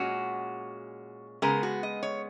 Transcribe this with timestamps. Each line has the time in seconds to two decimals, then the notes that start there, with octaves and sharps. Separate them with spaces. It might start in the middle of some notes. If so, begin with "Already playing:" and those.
Already playing: A#2 G#3 C#4 F#4
1.42 C#3 G#3 B3 A#4
1.63 F#4
1.83 D#5
2.03 C#5